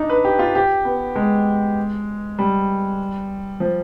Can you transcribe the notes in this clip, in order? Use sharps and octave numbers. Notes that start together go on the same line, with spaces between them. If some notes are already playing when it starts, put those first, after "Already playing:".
Already playing: D4 D#4
B4
G4
F4
G4
B3
G#3
G3
F3